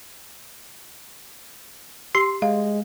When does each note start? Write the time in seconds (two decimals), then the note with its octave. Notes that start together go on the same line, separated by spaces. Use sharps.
2.15 G4 C6
2.42 G#3 F5